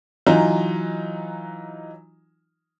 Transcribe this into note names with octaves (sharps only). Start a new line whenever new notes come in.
E3 F#3 D#4 F4